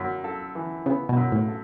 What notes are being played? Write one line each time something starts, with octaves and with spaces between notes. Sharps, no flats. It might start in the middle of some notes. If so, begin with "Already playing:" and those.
Already playing: F#2
A4
E3
C#3 B3
B2
F#2
A2
A4